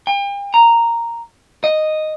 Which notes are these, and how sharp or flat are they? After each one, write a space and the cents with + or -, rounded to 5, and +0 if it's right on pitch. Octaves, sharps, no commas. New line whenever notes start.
G5 +40
A#5 -5
D#5 -5